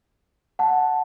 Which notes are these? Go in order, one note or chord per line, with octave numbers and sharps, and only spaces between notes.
F#5 A5